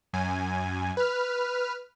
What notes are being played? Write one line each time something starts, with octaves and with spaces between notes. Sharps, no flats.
F#2 G#5
B4 F6